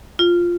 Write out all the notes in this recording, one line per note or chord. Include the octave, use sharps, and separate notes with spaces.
F4